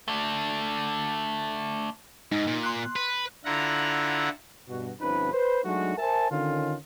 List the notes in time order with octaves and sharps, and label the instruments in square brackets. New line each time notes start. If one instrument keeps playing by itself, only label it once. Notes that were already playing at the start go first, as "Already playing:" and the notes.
[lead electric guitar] A3 D4
[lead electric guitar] G#2 [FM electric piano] D#4
[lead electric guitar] A#2
[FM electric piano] C6 F#6
[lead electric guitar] B4
[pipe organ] D3 E4 F4 F#5 A#5
[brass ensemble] G2 B2 F#4
G1 F3 C4 C#4 D#4 B4
B4 C5
F#3 G#3 A3 D4 D#4 F#4
A#4 C5 E5 G#5 A5
D3 D#3 C#4 F4